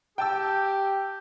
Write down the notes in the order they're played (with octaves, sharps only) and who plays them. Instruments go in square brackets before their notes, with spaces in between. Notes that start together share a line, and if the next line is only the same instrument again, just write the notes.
[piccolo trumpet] G4 [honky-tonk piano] G5 A5 E6